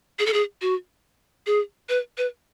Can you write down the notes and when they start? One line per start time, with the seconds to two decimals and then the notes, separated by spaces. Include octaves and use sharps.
0.19 G#4
0.26 A4
0.33 G#4
0.62 F#4
1.47 G#4
1.89 B4
2.18 B4